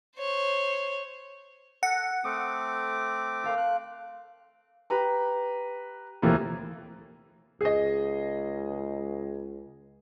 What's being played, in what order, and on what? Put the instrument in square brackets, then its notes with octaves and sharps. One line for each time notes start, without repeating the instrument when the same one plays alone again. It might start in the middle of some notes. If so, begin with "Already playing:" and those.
[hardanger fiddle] C5 C#5
[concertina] A4 [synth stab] F#5 [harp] A#6
[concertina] A3 C4 D6 [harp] D#6
[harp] A4 F5 C6
[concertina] F#6
[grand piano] G4 B4 A#5
D#2 C3 E3 F3 A3 A#3
[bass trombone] C#2 [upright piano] G#4 D#5